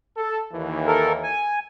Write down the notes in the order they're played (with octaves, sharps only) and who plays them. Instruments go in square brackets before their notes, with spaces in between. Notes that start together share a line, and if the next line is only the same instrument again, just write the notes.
[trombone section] A4
D#2 E3
[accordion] A4 A#4
G#5